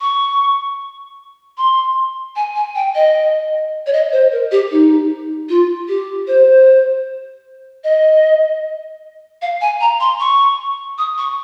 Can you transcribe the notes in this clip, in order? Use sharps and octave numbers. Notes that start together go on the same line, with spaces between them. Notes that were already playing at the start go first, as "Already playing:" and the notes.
C#6
C6
G#5
G#5
G5
D#5
C#5
D#5
C5
A#4
G4
D#4
F4
G4
C5
D#5
F5
G#5
A#5
C6
C#6
D#6
C#6